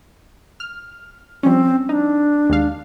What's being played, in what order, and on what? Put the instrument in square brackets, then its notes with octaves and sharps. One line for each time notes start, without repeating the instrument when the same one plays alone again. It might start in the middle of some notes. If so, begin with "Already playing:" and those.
[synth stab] F6
[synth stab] F3 G3 C#4 [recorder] C4
[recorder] D4 [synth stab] D#4
[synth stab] D#2 G#3 F5